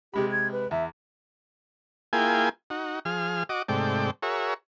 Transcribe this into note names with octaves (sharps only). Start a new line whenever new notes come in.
C3 G#3 G4 B5
G#6
B4
E2 E5
A#3 E4 F4 G#4 G5 G#5
D#4 F#4
F3 G#4 F6
F#4 D#5 D6
G#2 C3 A3 D5 G5
F#4 G#4 A#4 C#5 E5